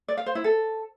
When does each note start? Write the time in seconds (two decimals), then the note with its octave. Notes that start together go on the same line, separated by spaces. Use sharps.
0.08 D5
0.17 F5
0.26 C5
0.35 E4
0.44 A4